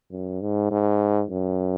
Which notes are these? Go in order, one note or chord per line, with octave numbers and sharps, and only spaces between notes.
F#2
G#2
G#2
F#2